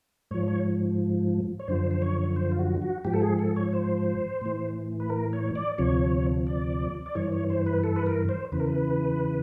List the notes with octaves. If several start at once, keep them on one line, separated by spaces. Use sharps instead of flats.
G#2 F3 C#5
C#5
C#5
F#2 D3 F3 C5
C5
C#5
C5
F4
F#4
F#4
G#2 F3 G4
A4
G#4
A4
C#5
C5
A2 E3
B4
A#4
C#5
D5
D2 C3 F3 C#5
D5
D5
G2 E3 C#5
C#5
C5
B4
A4
B4
A#4
C5
E2 C#3 E3 B4
A#4
B4